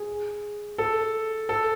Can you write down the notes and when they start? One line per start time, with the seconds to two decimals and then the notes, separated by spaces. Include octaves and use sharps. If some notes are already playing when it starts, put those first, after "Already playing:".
Already playing: G#4
0.78 A4
1.49 A4